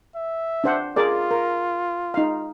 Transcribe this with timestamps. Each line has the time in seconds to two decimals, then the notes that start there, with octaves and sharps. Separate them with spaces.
0.15 E5
0.64 D4 C5 F#5
0.96 F4 G#4 A#4 D5
1.31 A#4
2.14 D#4 F5